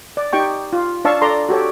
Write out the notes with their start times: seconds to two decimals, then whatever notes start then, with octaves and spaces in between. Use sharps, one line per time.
0.17 D5
0.33 D#4 G4 G5 C#6
0.73 F4
1.05 D4 C#5 F5 A5 C#6 E6
1.21 A4 D5 A#5 C6
1.49 F#4 G4 A4 C#5